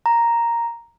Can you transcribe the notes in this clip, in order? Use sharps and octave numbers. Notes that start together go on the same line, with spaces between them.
A#5